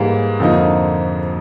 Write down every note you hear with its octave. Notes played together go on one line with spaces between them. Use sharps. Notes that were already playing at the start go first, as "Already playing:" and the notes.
Already playing: G#2 E3 G3 A#3
F2 D3 F3 A#3 D#4